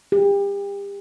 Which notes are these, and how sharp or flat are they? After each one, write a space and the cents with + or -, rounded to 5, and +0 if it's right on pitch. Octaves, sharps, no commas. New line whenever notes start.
G4 +35